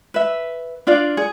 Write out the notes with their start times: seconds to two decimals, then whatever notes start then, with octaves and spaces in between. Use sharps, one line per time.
0.14 B4 E5
0.87 D4 F4 D5 F5
1.17 G#4